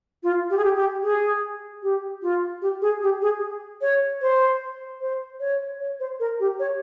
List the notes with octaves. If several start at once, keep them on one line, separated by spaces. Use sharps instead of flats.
F4
G4
G#4
G4
G4
G#4
G4
F4
G4
G#4
G4
G#4
C#5
C5
C5
C#5
C#5
C5
A#4
G4
C#5